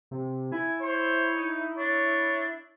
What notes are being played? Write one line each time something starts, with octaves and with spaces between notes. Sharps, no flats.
C3
E4 G#5
C5 C#5
D#4
D4 C#5